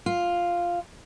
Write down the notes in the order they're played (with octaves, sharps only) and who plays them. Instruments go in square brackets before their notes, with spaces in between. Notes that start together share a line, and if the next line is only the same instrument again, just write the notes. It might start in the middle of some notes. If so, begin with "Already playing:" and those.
[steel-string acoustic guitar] F4